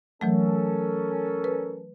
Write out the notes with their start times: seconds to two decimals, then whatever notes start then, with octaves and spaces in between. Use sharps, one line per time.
0.21 E3 F#3 A3 C#4 A4 A#4
1.44 B4